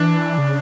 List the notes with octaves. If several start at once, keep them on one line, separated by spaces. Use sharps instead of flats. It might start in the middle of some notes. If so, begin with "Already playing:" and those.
Already playing: E3 D4
C#3